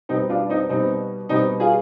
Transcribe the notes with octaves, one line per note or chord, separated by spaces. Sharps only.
B2 G3 B3 C4 D#4
D4 F4
C4 D#4
B2 G3 B3 C4 D#4
B2 G3 B3 C4 D#4
F4 G#4